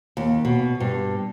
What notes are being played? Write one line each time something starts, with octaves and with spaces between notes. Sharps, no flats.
D#2
B2
G2